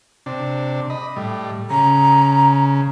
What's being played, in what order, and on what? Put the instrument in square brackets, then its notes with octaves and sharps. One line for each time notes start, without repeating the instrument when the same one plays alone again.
[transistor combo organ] C3 D4
D#5 B5
A2 G3
[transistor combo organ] C#3 [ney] A#5